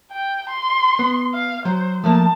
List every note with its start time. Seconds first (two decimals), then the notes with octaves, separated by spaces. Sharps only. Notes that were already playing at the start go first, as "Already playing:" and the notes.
0.12 G5
0.50 C6
0.99 B3
1.34 F5
1.65 F#3 C5
2.04 F3 A3 A#3 A5